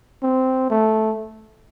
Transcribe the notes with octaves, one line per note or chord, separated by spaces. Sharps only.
C4
A3